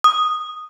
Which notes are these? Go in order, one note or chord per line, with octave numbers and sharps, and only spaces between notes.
D#6